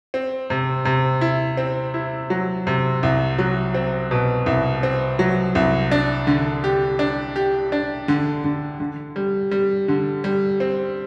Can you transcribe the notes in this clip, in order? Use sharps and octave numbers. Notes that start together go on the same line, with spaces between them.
C4
C3
C3
E4
C4
E4
F#3
C3
C2
F#3
C4
B2
C2
C4
F#3
C2
D4
D3
G4
D4
G4
D4
D3
D3
D3
G3
G3
D3
G3
C4